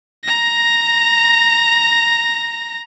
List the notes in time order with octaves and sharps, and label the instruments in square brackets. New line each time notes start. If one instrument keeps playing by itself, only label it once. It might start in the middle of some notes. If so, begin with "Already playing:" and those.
[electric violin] A#5 A#6